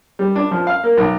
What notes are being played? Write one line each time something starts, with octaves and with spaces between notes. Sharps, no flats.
G3
D4
F3
F5
A#3
B1